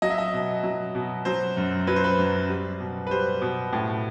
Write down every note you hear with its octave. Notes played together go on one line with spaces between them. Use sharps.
F#3 D#5
E5
D#5
B2
F#3
B2
F#3 C5
F#2
F#3 B4
C5
B4
F#2
G3
B2
B4
G3 C5
B2
A2